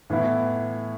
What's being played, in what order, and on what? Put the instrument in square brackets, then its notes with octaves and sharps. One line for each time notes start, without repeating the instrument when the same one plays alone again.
[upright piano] A2 E3 B3 E4